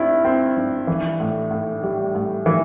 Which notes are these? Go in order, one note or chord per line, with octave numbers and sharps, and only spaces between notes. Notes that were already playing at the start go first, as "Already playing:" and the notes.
Already playing: G2 C4 E4
C4
G2
E3
A2
A2
G3
A2
E3